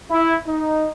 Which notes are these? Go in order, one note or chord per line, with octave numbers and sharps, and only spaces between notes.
E4
D#4